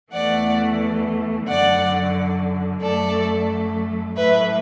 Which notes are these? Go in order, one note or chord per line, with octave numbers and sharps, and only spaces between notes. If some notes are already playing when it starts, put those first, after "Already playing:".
E2 E3 A3 D5 F#5
F#2 D3 F#3 D5 F#5
F#2 F#3 A3 A4 D5
A2 F#3 A3 B4 E5